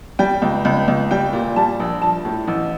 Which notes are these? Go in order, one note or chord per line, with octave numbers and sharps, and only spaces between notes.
G3 G5
C#2
C#2
C#2
G3 G5
A#2
G3 A5
A#1
F3 A5
A2
A1